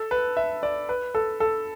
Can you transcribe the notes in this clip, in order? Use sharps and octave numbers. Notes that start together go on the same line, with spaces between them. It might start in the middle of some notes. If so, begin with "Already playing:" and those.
Already playing: A4
B4
E5
D5
B4
A4
A4